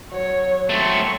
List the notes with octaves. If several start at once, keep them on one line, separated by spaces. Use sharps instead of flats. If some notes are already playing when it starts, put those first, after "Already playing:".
F#3 C#5
A3 C4 C#6